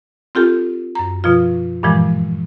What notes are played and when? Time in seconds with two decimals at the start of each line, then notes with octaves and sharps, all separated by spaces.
0.35 C4 F4 G4 A4
0.95 F#2 A#5
1.24 B2 F3 F4
1.83 G2 A#2 E3 F3 G#3